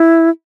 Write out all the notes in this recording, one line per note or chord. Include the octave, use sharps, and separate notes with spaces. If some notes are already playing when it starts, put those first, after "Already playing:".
Already playing: E4